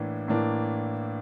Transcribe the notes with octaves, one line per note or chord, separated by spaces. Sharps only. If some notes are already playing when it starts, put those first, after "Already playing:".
Already playing: A2 E3 A#3 D4
A2 E3 A#3 D4